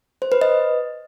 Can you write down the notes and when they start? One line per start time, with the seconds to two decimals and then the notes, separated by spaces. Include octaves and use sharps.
0.22 C5
0.32 B4
0.41 D#5